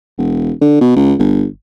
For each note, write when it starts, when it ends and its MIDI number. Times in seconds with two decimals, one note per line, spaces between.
0.18 0.52 28
0.62 0.78 50
0.81 0.91 47
0.96 1.14 37
1.19 1.45 31